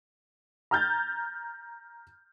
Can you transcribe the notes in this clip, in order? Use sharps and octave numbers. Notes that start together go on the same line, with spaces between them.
A#5 F6 G6 A6